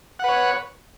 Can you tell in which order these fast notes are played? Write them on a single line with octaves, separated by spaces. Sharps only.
F#5 B4 C#5